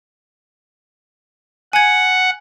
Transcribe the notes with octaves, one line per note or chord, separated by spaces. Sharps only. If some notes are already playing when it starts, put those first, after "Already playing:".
F#5 G#5 G#6